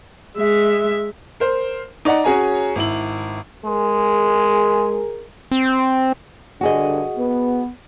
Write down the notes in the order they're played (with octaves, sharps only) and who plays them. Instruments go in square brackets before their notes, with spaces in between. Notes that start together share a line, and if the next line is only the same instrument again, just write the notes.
[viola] G#3 E5
[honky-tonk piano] A#4 C5
D#4 D5 D#5 F#5 A#5
C#4 F#4 G#4 C#5 G#5 A#5
G#1 E4 F#7
[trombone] G#3 [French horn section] G#4 A#4
[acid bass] C4
[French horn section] G2 D3 [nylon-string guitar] F#4 G#4 D#5
[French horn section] B3